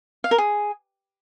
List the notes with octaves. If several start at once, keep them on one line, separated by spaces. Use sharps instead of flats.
F5
A#4
G#4